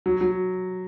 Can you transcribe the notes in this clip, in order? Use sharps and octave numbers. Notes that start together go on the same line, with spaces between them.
F#3
F#3